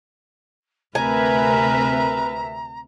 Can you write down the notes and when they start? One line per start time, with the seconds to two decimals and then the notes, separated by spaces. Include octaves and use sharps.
0.95 D2 C3 A#4 B4 E5 G#5 A#5